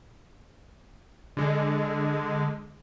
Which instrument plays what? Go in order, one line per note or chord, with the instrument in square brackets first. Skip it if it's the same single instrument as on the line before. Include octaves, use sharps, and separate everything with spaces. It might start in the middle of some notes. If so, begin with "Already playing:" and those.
[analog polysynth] D3 G#3